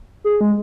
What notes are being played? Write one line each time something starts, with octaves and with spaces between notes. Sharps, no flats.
G#4
G#3